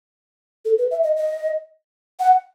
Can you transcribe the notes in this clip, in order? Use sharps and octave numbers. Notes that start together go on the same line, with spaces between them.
A4
B4
E5
D#5
D#5
F#5